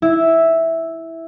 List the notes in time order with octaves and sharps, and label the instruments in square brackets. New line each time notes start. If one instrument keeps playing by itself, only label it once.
[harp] E4